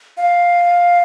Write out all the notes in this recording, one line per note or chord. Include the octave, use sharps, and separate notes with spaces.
F5